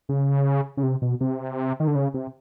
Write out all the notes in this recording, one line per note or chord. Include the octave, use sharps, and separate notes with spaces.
C#3
C#3
C3
B2
C3
D#3
D3
C#3
C3